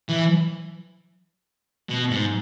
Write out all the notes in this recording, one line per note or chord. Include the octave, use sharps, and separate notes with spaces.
E3
B2
G#2